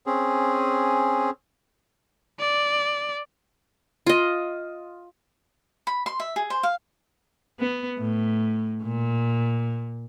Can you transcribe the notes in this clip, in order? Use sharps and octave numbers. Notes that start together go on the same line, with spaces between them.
C4 C#4 G#4
D5
F4 D#5
B5
C6
E5
G#4
C5
F5
B3
A2
A#2